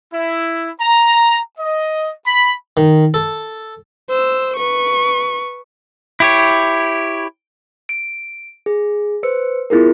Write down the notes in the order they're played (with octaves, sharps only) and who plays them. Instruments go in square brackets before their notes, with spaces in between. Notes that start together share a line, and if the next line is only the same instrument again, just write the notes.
[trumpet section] E4
A#5
D#5
B5
[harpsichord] D#3
A4
[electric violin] C5 E6
B4 C#6
[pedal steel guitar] E4 G4 C#5
[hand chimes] D7
G#4
B4 C5 E6 C#7
B3 E4 F4 G#4 A#4